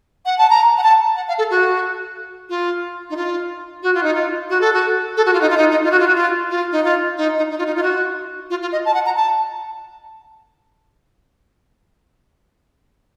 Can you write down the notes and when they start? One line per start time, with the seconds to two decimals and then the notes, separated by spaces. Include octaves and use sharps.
0.26 F#5
0.38 A5
0.50 A#5
0.78 F#5
0.83 A5
1.16 F#5
1.28 F5
1.38 A4
1.50 F#4
2.49 F4
3.10 D#4
3.17 F4
3.83 F#4
3.94 F4
4.03 D#4
4.14 F4
4.50 F#4
4.61 A4
4.73 F#4
5.17 A4
5.26 F#4
5.33 F4
5.41 D#4
5.50 F4
5.57 D#4
5.71 D#4
5.83 F4
5.91 F#4
5.99 F4
6.08 F#4
6.15 F4
6.50 F4
6.72 D#4
6.84 F4
7.17 D#4
7.38 D#4
7.50 D#4
7.58 F4
7.66 D#4
7.76 F4
7.83 F#4
8.50 F4
8.62 F4
8.72 D#5
8.85 A5
8.94 F#5
9.06 A#5
9.16 A5